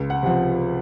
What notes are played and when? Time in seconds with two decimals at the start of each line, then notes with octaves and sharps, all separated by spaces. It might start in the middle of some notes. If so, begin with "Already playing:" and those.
Already playing: C#2
0.10 F#5
0.23 C3 F3 F#5